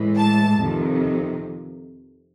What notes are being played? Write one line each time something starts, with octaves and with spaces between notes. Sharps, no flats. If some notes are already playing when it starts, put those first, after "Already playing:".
Already playing: A2 E3 G#3
A5
F2 C3 D#3